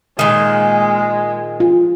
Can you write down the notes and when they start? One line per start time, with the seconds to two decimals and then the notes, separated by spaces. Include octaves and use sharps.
0.19 A#2 D#3 G#3
1.60 F4